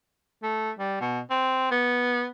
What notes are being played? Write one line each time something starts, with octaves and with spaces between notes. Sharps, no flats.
A3
G3
B2
C4
B3